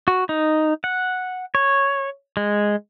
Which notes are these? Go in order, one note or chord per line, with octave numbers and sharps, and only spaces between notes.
F#4
D#4
F#5
C#5
G#3